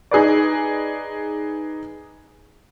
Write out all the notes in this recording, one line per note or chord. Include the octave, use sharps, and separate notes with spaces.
D#4 G#4 B4 D5